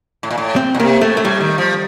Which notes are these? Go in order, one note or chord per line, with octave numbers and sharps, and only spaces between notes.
A2
A#2
A2
C4
A#2
C3 A#3
A2 A3
A3
A2 G3
D#3
F3